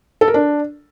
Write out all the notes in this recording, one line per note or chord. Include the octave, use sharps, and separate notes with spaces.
A4
A#4
D4